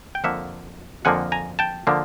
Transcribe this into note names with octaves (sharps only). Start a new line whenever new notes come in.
G5
F2 D3 F3 A#3 E5 F#5
F2 D3 F3 A#3 F#5 G#5
G#5 A#5
G5 A5
D3 F3 A#3